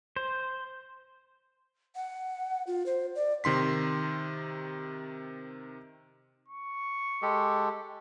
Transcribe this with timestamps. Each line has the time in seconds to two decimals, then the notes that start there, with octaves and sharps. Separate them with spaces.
0.16 C5
1.95 F#5
2.67 F4
2.86 C5
3.15 D5
3.44 C3 D#3 C6 B6
6.48 C#6
7.22 G#3 G4 A4